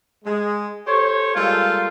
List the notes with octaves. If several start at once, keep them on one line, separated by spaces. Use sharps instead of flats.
G#3
G4 A4 C5 C#5
G3 G#3 A#3 F4 A4